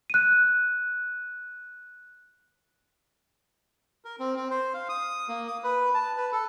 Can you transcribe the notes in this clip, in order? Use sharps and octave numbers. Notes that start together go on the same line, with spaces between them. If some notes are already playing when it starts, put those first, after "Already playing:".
F#6 D#7
A#4
C4
C4
C5
F5
D#6
A#3
D#6
B4
A5
B4
A4